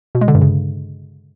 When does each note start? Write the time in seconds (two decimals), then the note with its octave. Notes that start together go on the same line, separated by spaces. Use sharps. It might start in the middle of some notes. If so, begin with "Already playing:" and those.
0.15 B2
0.21 G#3
0.28 D3
0.35 G2
0.41 C#3